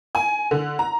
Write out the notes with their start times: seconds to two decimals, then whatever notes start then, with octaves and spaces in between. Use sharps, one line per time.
0.15 G#5
0.51 D3
0.79 A#5